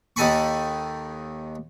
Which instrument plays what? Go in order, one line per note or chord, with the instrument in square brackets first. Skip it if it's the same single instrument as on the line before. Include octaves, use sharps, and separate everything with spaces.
[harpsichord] D#2 D#3 A4 G#5 B5 C#6